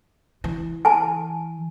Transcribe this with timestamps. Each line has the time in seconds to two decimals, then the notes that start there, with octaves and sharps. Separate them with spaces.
0.44 E3
0.85 G#5 A5